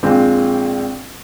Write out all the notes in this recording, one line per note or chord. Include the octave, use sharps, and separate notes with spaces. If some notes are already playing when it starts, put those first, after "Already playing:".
A#1 G#3 C4 F4 G5